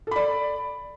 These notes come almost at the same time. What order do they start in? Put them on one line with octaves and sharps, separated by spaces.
A4 B5 D5